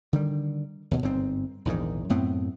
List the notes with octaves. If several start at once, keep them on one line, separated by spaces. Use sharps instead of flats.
D3 D#3 G3
D#2 B2
G1 G#2 C4
A#1 E2 G#2 D#3
F#2 A2 B3 C4